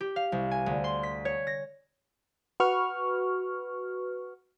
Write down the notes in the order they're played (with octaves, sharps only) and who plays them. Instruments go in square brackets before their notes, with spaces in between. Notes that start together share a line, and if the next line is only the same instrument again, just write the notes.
[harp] G4
F5
C2
G#5
D2
C6
B6
C#5
A#6
[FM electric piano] F#4 B4 C#6 F6